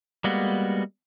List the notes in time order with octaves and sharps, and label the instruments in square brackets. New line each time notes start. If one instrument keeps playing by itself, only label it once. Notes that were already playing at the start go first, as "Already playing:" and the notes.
[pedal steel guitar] G3 G#3 A#3 B3 F#4